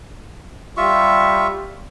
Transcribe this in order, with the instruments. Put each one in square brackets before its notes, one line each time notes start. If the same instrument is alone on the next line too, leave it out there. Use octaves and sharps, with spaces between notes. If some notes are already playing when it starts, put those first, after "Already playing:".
[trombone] G3 [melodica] F4 E5 C#6